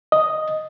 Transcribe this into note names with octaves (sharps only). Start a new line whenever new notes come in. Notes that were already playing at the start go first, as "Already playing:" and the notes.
D#5